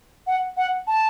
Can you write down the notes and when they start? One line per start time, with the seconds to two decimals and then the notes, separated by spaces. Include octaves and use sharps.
0.27 F#5
0.57 F#5
0.88 A5